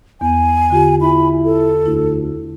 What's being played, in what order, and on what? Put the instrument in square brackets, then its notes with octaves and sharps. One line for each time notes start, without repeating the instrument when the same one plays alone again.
[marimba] E2 B3 [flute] G#5
[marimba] D3 F4 G4
[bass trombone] E4 [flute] B5
[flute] A4
[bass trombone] D2 [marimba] E4